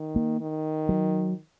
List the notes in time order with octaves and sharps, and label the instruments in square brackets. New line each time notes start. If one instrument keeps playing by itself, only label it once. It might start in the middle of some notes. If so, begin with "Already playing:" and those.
Already playing: [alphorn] D#3
[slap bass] A#3
[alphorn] D#3
[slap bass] F#3